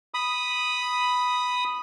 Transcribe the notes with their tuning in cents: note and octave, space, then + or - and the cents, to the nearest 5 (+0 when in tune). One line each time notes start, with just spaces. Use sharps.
B5 +0 D#6 +0